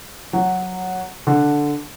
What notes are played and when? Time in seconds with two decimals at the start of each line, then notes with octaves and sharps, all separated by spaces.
0.33 F#3
1.27 D3